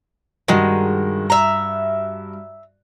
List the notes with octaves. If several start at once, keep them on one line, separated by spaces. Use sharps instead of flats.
G2 D#3 G#3 F#4 A#6
E5 A#5